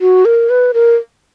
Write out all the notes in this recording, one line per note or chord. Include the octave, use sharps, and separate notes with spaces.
F#4
A#4
B4
A#4